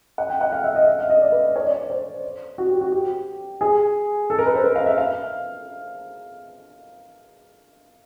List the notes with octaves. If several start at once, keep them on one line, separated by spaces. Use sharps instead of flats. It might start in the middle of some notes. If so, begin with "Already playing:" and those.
F#5
G5
F#5
F5
E5
D#5
E5
F5
D#5
D5
B4
C#5
D5
C5
F#4
G4
F#4
G4
G#4
A4
A#4
B4
C5
B4
F5
E5
F5